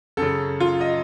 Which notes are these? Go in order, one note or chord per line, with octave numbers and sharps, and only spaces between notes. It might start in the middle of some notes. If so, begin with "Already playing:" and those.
F#2 C#3 A4
F4
D#5